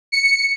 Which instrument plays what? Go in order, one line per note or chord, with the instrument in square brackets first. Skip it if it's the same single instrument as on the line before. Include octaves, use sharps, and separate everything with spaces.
[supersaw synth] C#7